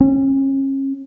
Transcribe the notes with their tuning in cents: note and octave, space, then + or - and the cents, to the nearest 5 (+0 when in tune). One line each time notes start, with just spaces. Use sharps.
C#4 -35